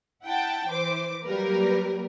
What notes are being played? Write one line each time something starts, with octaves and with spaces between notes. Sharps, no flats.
E4 F#5 G5 A5
E3 C5 D6
F#3 G3 A#3 A#4 B4